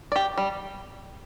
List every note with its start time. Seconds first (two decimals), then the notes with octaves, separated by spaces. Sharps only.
0.12 G4 D5
0.37 G3